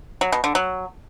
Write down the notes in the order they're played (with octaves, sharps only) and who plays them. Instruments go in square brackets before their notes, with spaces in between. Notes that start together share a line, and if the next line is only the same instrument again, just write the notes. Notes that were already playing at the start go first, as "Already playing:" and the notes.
[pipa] F#3
B2
D3
F#3